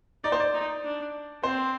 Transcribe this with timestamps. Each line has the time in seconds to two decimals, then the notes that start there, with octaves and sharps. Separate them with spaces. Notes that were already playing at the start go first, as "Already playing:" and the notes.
0.24 D#4 D5
0.32 C5
0.40 D5
0.54 D#4
0.84 D4
1.43 C4 C5